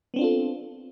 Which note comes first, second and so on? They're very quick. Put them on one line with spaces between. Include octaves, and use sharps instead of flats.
B3 C4 D4 F4 A4